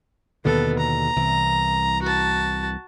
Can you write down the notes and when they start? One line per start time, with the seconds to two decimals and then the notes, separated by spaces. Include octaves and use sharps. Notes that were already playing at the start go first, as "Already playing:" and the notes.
0.45 D#2 B2 D3 B3 A4
0.79 A#5
1.16 C2 E3
2.02 F#4 A5